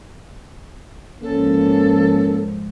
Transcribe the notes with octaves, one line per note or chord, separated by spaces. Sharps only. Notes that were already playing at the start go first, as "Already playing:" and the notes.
G#2 F3 A#3 C#4 A4